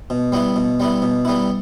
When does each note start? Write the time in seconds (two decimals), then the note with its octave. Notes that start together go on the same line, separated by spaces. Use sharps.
0.10 B2
0.32 G3 B3 E4
0.56 B2
0.80 G3 B3 E4
1.02 B2
1.25 G3 B3 E4